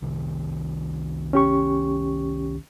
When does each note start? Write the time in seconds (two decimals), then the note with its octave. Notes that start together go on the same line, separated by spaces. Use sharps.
0.02 C2 C3 D#3
1.33 C#4 G4 C#6